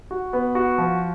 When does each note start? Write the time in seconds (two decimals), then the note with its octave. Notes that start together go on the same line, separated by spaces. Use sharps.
0.11 F#4
0.33 B3
0.55 F#4
0.78 F3